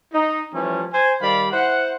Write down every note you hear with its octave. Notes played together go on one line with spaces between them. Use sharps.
D#4
E3 F3 G3 A3 C#4
C5 G#5
D#3 G3 D5 F5 B5
E4 C5 F#5